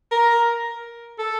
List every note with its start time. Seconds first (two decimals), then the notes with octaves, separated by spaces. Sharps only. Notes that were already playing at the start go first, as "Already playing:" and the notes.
0.11 A#4
1.19 A4